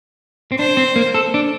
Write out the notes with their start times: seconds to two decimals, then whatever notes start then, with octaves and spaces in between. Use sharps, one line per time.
0.52 C4
0.59 D4 C5
0.77 C4
0.96 A#3
1.14 A4
1.34 D4